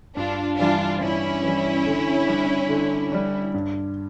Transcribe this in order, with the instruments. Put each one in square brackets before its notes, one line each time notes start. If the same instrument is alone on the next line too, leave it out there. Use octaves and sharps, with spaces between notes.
[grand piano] G2 [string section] D4 F4
[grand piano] E3 G3 [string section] D4 F4
[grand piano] G2 [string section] C#4 E4
[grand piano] E3 G3
D3
G3 D4
D3
G3 D4
G2